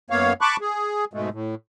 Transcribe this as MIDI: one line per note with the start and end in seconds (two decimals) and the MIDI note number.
0.10 0.33 42
0.10 0.33 58
0.10 0.33 59
0.10 0.33 73
0.10 0.33 77
0.41 0.57 81
0.41 0.57 83
0.41 0.57 85
0.41 0.57 86
0.41 0.57 90
0.61 1.05 68
1.14 1.29 44
1.14 1.29 47
1.14 1.29 56
1.14 1.29 57
1.33 1.55 45